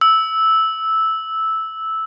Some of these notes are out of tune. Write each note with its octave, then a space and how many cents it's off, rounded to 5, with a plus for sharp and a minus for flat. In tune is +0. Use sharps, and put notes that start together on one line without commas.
E6 -10